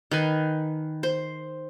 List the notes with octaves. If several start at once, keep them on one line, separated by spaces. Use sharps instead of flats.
D#3 B4 G#5
C5